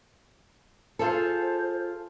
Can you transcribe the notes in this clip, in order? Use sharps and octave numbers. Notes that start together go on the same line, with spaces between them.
F4 G#4 A4 C5